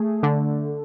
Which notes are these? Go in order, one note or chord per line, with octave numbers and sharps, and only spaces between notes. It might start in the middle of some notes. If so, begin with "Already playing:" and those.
Already playing: A3 G#4
D3